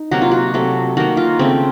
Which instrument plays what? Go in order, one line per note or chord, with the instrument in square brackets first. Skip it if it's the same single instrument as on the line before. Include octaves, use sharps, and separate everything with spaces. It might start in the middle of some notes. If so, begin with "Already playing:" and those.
Already playing: [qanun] D#4
C3 F#3 A#3 F#4
F4
F#4
C3 F#3 A3
D#3 A#3 F#4
F4
C#3 A3 C4